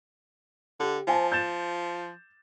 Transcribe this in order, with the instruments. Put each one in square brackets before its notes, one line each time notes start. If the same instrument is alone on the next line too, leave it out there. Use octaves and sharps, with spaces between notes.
[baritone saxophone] D3 [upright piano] G4
[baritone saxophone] F3 [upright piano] C5 G#5 A5
[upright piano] G6 A6 E7